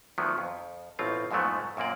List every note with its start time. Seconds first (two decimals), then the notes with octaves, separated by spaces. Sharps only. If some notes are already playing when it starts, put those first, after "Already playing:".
0.18 D2 D#3 F3 F#3 B3
0.38 F2
0.99 A1 B2 C4 F4
1.31 F2 G#2 F3 F#3 A3 B3
1.77 F#2 A#2 A#3 D5